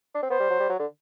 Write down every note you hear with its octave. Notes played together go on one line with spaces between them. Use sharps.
D4
C4
B3 C5
G3
F#3
G3
F#3
D3